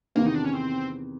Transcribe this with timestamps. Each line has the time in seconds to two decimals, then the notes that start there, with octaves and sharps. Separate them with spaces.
0.15 E2 C3 D#3 A#3
0.26 D#4
0.34 D4
0.44 C#4
0.53 C4